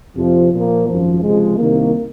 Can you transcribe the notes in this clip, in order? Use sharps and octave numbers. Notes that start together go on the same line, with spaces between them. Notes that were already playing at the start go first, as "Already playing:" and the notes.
F2 C3 F3
A#2 F3 A#3
G#1 F#2 F3
C#2 C3 F3 G#3
C2 C3 D#3 A#3